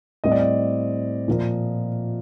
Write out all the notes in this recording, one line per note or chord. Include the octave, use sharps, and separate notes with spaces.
A2 G3 C4 D#5
D5
D#5
A#2 F3 A#3